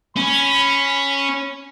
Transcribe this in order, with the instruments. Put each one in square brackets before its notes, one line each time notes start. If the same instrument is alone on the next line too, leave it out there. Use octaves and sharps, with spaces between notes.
[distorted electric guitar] C#4 [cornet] B5